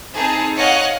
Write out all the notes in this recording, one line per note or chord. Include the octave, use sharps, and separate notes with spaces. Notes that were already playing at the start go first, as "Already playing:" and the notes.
C4 D#4 G#4 A5
C#5 D#5 F5 F#5 F#6